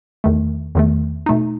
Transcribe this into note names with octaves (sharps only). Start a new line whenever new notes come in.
E2 D#3 A3
E2 D#3 A3
B2 A3 D#4